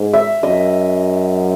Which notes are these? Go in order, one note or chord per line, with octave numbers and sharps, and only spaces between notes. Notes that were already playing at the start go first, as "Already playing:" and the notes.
Already playing: G#2
E5
F#2 D#5